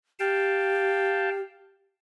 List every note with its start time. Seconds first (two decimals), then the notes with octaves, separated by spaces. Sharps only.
0.20 G4 F5 G5 A5